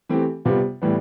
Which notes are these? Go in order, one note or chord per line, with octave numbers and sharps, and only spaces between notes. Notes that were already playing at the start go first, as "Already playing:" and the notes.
E3 A3 C4 G4
C3 G3 B3 F4
A2 E3 G3 B3